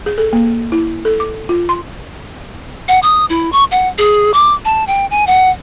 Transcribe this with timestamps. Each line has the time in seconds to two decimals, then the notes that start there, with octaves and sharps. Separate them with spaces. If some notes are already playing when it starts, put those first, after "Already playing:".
0.06 G#4
0.18 A4
0.33 A#3
0.72 E4
1.05 A4
1.20 D6
1.49 F4
1.69 C6
2.88 F#5
3.03 D#6
3.29 E4
3.52 C#6
3.72 F#5
3.98 G#4
4.34 D6
4.65 A5
4.87 G5
5.11 G#5
5.27 F#5